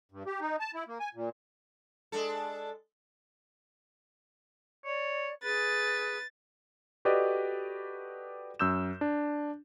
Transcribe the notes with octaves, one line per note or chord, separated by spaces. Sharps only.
G2
G4
D#4
A5
E4
A#3
G#5
A#2
G#3 D4 A4
C#5 D5
G#4 B4 A6
F#4 G4 A4 B4 D5 D#5
F#2 E6 G6 E7
D4